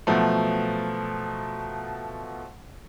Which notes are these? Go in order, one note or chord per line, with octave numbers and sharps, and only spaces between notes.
B2 F3 F#3 A3